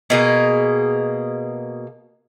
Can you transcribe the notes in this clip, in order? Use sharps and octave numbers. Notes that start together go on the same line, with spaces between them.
B2 A#3 G#4